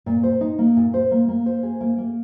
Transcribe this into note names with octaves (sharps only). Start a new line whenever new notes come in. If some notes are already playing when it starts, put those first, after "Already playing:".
A#2
C5
D#4
A#3
A#2
C5
A#3
A#3
C5
G#4
A#3
A#3